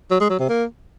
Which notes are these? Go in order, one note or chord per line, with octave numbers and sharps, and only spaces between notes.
F#3
G#3
F#3
C3
A#3